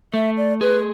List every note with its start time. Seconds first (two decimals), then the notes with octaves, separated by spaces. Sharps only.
0.14 A3 E5
0.37 D5
0.61 G#4 B4